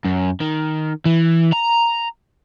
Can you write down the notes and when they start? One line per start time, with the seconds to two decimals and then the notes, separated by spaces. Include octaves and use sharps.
0.05 F#2
0.41 D#3
1.06 E3
1.53 A#5